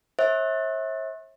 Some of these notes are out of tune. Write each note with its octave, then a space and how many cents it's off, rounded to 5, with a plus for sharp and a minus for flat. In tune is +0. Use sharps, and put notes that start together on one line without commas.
C#5 -45 E5 -30